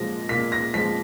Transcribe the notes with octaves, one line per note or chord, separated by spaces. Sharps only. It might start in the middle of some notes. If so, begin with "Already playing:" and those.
Already playing: A#2 F3 G#3 A#6
A#2 B6
A#6
F3 G#3 B6